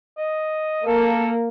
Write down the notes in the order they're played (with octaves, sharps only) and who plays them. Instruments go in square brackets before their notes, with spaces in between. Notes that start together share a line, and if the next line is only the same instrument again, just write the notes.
[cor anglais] D#5
[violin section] A#3 [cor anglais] A4